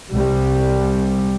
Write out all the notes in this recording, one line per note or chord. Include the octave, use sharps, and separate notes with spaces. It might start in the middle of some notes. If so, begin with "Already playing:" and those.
C2 G3